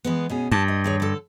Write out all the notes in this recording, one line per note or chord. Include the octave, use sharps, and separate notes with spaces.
E3 G#3 B3
B2 C#4 G#4
G2 A5
D#5
D#2 G#4 C#5
D3 A4